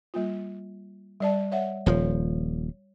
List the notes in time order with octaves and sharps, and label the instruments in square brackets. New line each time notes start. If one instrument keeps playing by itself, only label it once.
[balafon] G3 A#3 F4
G3 D5 A5
C#5 E5 F#5
[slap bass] D#1 F3 [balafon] C#5